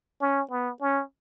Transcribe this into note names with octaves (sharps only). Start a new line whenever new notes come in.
C#4
B3
C#4